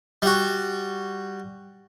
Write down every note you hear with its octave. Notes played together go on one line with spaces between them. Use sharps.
G3 F#4